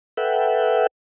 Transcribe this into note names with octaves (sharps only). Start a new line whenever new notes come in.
A4 B4 E5 F#5 G5